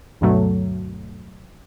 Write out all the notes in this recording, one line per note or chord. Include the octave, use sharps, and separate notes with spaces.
D2 G2 B2 F#3 A3